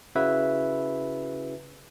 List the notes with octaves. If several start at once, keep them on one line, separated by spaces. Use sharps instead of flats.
C#3 E4 F#4 B4 E5